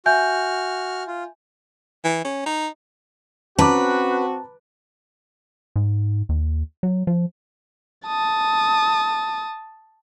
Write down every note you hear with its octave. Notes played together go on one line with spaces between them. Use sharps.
F#4 E5 G#5 F6 G6
F4
E3
C#4
D#4
C4 C#4 F#4 B4 A5 A#5 D6
G#2
D#2
F#3
F3
A5 D#6